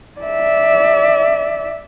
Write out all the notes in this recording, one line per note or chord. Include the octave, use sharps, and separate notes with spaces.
D5 E5